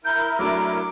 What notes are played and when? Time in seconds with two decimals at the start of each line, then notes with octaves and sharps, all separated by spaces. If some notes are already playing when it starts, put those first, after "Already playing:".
0.05 E4 A#4 G6
0.39 F#3 A3 D4 D6